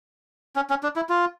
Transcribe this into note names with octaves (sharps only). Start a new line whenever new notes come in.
C#4
C#4
D4
E4
F4